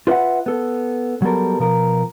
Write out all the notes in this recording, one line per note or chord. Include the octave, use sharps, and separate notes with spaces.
F4 B4 D#5 E5 F#5
B3 A4
F#3 G3 B3 A4 A#4
B2 F3 A#4